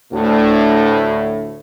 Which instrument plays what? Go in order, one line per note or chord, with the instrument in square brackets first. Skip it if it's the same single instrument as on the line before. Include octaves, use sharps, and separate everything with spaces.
[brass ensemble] D2 A2 A3